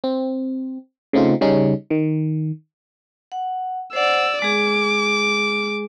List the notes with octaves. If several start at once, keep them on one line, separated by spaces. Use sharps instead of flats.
C4
C#3 A3 C4 D#4 F4
C#3 G3 C#4 D#4
D#3
F#5
C5 D5 F#5 E6
G#3 G#4 D6